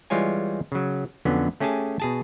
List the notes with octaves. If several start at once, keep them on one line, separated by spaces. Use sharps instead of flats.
E3 G3 G#3 F4 C#5 G#5
C#3 F#3
F2 D3 F#3 B3 C#4
A3 C#4 G4 G#4 G#5 A5
B2 G#4 A5